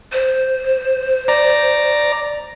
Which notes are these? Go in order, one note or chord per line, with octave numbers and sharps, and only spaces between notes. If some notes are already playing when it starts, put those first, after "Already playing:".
C5
D5 A#5